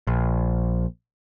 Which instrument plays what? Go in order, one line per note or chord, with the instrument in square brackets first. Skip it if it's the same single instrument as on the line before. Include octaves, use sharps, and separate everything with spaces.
[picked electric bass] A#1